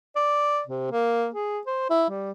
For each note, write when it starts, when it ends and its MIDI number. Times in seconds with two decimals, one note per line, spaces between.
0.16 0.62 74
0.67 0.87 48
0.91 1.28 58
1.34 1.59 68
1.66 1.86 72
1.90 2.05 64
2.09 2.31 55